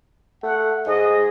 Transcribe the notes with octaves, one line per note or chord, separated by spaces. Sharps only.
A3 F#5
G#2 G#4 D#5